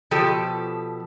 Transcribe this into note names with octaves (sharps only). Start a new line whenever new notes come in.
B2 F3 G4 A4